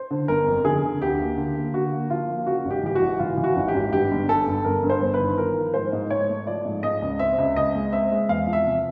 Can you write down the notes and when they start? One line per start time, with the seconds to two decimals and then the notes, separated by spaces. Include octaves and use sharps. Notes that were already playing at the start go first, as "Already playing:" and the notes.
Already playing: C5
0.11 D3
0.28 G1 A#4
0.47 F2
0.64 D3 G#4
0.83 D3
1.01 D2 G4
1.19 A#3
1.37 D3
1.56 A#3
1.74 D3 F#4
1.92 A#3
2.10 F3 F4
2.29 A#3
2.46 C#3 F#4
2.65 G#1
2.71 G4
2.83 E3 G4
2.95 F#4
3.01 G#1
3.19 E3 F4
3.37 E3
3.44 F#4
3.56 G#1
3.68 G4
3.74 G#1
3.92 G2 G4
4.11 G1
4.29 G2 A4
4.47 G2
4.65 G1 A#4
4.83 G2
4.89 C5
5.02 G1
5.14 B4
5.19 D#3
5.38 F3 A#4
5.56 F3
5.74 G#2 C5
5.92 G#2
6.10 G#2 C#5
6.29 A3
6.47 F3 D5
6.65 G#2
6.83 G#3 D#5
7.02 C#2
7.19 C4 E5
7.38 C#2
7.56 C#2 D#5
7.75 G#3
7.93 C4 E5
8.11 G#3
8.29 E2 F5
8.47 F3
8.53 E5
8.65 C3